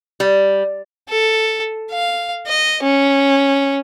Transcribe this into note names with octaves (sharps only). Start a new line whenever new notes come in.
G3
A4
F5
D#5
C#4